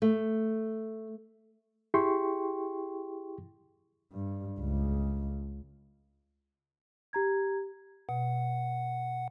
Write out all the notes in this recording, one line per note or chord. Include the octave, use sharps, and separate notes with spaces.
A3
E4 G4 G#4 G5 C6 C#6
G2
C#2
G4 A#5 G#6
B2 F#5